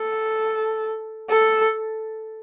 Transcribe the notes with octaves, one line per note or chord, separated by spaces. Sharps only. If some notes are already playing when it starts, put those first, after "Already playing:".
Already playing: A4
A4